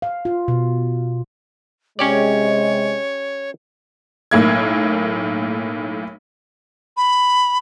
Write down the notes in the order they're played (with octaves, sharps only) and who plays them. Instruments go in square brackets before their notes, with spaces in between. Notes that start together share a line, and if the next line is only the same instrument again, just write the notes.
[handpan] F5
F4
B2
[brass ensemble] C3 G#3 [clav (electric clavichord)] C#4 G4 D5 [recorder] C#5
[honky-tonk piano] B1 A2 A#3 G#6
[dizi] B5